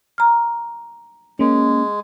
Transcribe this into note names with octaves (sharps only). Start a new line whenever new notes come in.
A#5 F6
G#3 A#3 C#4